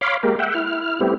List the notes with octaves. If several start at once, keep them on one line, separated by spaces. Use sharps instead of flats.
C#5 F5 B5 C6 D6
G#3 A#3 G4 A#4
E5 F#5 G5
E4 F6
G3 A3 B3 C4 E4 G4